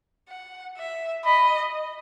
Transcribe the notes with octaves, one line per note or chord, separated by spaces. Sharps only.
F#5
E5
D#5 B5